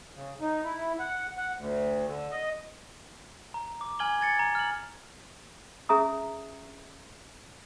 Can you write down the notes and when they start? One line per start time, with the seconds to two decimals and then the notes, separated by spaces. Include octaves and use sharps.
0.15 C#3
0.41 D#4
0.64 E4
0.99 F#5
1.37 F#5
1.57 D2
2.08 D3
2.31 D#5
3.54 A#5
3.81 D6
3.99 G#5 F6 G#6 F#7 G7
4.21 G#6 A6 C#7
4.39 A#5
4.55 F6 F#7
5.89 C#4 G#4 E5 A#5 D#6